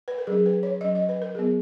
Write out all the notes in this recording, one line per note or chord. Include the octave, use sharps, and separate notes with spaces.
B4
A#4
F#3 C#4 G#4
B4
C#5
F#3 C#4 D#5
D#5
B4
A#4
F#3 B3 G#4